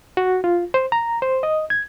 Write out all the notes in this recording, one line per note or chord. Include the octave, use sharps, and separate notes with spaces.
F#4
F4
C5
A#5
C5
D#5
G#6